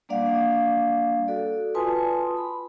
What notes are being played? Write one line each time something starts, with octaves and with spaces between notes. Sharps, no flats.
G3 A#3 D4 D5 F5 F#5
F#4 A4 D5
F4 B4 G#5 A5 C6 D#6
B5